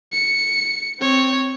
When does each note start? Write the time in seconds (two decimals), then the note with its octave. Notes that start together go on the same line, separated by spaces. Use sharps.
0.12 C#7
1.00 C4 C#5